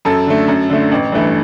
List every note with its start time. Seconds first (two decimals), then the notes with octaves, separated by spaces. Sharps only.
0.05 F#2 A4
0.27 D3 A3
0.48 F#2
0.69 D3 A3
0.92 A1
1.12 G2 E3 A3